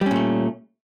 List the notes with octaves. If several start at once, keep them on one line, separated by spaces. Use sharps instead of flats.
A#2 G3 A3 C#4